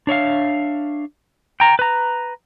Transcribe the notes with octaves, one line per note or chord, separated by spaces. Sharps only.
D4 C#5 E5 F5
G5 A#5
B4 A#5